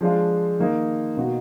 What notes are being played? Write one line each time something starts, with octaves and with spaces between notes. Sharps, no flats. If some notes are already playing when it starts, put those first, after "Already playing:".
F3 G#3 D4 F4
D#3 A#3 D#4
B2 A#3 D#4 F#4